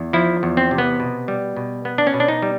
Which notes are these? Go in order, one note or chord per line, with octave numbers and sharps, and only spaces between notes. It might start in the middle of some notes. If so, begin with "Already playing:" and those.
Already playing: E2
F3 E4
E2
C4
C3
B3
B2
G3
B2
B3
D4
C#4
B2
D4
D#4
G3